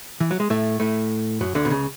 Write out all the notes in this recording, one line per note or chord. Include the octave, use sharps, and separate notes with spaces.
E3
F#3
G#3
A2 A3
A2 A3
F#2 F#3
D2 D3
B2
C#2 C#3